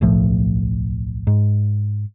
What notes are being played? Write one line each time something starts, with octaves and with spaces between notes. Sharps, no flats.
D1 B1 A2 F3
G#2